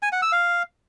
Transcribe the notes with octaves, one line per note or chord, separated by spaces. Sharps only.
G#5
F#5
E6
F5